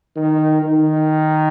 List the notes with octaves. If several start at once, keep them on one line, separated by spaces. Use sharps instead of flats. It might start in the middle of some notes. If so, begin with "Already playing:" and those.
D#3
D#3